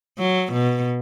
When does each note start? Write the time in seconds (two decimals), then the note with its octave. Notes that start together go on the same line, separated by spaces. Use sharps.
0.19 F#3
0.53 B2